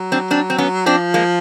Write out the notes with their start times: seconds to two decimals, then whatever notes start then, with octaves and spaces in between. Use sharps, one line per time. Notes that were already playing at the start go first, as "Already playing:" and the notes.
Already playing: F#3
0.12 C4 D4
0.31 C4 D4
0.50 C4
0.58 B3 C#4
0.86 F3 C4 D4
1.14 G#3 A#3